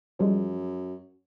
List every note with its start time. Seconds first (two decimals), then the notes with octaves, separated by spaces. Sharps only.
0.19 F#2 F3 G3 G#3